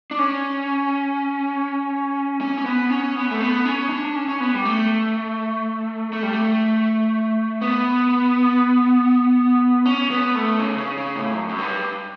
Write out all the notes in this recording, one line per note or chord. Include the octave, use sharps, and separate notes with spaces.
D4
C#4
C#4
C#4
B3
C#4
B3
A3
B3
C#4
D4
D4
C#4
C#4
B3
G3
A3
A3
G3
A3
B3
C#4
B3
A3
C#3
C#3
C#3
A2
F#2
F#2
G2